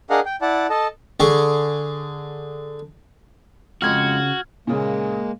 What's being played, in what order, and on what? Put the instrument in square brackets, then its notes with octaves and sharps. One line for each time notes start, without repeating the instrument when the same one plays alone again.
[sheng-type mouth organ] D4 G#4 A#4 D#5 F5 F#5
G5
E4 D5 F#5 A5
A4 D#5 A5
[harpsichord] D3 G#4 C#6
[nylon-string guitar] F2 G#3 D#5 [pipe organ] C#3 [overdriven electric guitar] F#4 [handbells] F6 G#6
[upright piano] A#2 C#3 [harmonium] G#3 A#3